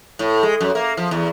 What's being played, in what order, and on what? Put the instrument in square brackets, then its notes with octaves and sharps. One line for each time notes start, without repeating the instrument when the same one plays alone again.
[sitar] A2
G#3
F#2
A#3
F3
E2